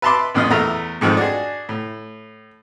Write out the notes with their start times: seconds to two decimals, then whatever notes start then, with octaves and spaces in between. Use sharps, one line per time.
0.02 B4 E5 A5 B5 C6 D6
0.34 A1 F#2 A#2 D#5
0.50 E2 A3 A#4 E5 A#5
1.01 F2 G#2 D#3 F3
1.17 D4 F#4 G#4
1.69 A2